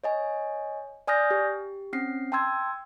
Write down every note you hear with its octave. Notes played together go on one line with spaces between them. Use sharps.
C#5 D#5 G#5
D5 G#5 D#6 F6 G6 A#6
G4
C4 C#4 C7
G5 A5 C6 E6 G#6